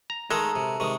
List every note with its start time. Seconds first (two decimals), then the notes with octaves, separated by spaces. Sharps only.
0.10 A#5
0.31 D#3 G#3 A3 A4 A#4 A#5
0.56 C3
0.80 C3 D#3 G#3 C#6 D#6